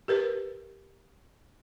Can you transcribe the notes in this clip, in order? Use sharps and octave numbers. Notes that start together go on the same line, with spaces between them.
G4 A#4 B4